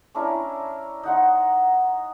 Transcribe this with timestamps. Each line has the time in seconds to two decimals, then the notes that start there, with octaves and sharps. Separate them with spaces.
0.15 C#4 D4 E4 A#4
1.03 D#4 F#5 C6